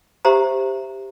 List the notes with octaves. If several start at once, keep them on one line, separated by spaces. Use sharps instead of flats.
G4 C5 E5 A#5